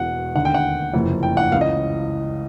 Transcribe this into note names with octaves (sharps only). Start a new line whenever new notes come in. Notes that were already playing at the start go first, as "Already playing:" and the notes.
Already playing: E1 E2 B2 F#5
D#2 D3 F#5
G5
F#5
F#1 F2 C3 E3
G5
F#5
C#2 C#3 E3 F5
D#5